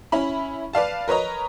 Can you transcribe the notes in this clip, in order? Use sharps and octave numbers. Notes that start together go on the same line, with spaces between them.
C#4 E4 B5
B4 D5 F5 A5
A#4 B4 C#5 D#5 A#5